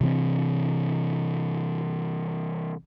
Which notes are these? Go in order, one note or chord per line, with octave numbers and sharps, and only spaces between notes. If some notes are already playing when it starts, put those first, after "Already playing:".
C3 E3 C4